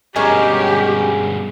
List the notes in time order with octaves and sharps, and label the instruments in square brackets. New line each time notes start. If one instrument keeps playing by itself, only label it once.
[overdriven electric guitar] G2 B2 [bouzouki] G#3 C#4 A#4 [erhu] G4